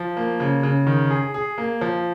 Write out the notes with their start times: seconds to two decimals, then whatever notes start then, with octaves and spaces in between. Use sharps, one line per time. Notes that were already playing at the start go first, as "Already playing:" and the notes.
Already playing: F3
0.17 A#3
0.40 C#3
0.63 C#3
0.87 D#3
1.10 G#4
1.34 G#4
1.58 A#3
1.81 F3